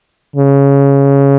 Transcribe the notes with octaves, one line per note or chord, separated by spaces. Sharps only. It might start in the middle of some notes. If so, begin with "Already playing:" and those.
C#3